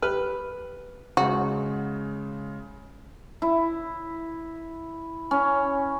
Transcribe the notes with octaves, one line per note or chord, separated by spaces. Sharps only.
G4 B4 F6
C#3 G#3 F#4
E4
C#4